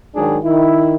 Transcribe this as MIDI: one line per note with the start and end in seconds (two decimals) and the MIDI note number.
0.15 0.38 44
0.15 0.38 51
0.15 0.38 54
0.15 0.38 62
0.15 0.38 68
0.44 0.96 51
0.44 0.96 64